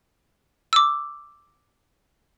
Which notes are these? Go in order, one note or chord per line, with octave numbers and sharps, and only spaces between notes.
D6 E6